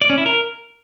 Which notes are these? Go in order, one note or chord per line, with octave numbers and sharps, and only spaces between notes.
D5
C#4
E4
A#4